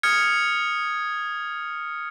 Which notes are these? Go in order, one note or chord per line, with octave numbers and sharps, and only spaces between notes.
D#6 F6 G#6 C#7